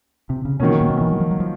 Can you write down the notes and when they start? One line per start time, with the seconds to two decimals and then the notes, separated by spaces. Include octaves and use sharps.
0.30 C3
0.45 C#3
0.60 B2 D#3 F#3 A#3 C#4
0.81 A#2
0.90 B2
1.01 E3
1.11 F#3
1.20 F3
1.31 F#3
1.40 F3